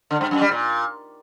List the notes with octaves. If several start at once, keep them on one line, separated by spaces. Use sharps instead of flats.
D3
G2
F#2
G3
A#2